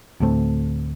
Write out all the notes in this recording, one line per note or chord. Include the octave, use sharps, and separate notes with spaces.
D2 A2 A3 C4